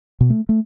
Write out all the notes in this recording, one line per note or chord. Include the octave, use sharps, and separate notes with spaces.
B2
A3
A3